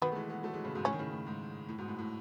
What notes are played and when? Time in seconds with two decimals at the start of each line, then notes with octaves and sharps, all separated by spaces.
0.02 B2 D#3 B3
0.12 A3
0.15 E3 G#3
0.29 G#3 B3
0.43 F#3 A3
0.53 E3 G#3
0.64 A2 C#3
0.74 G#2 B2
0.85 A2 C#4
0.93 D#3
0.99 A2 C#3
1.13 A2
1.27 G#2
1.69 A2
1.78 G#2 B2
1.88 A2
1.99 A2